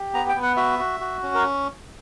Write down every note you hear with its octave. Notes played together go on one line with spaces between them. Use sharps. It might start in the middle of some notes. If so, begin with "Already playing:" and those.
Already playing: G4
B3 A#5
G5
B3
F#5
F#4 E5
F#4
F#4
C#4
A#4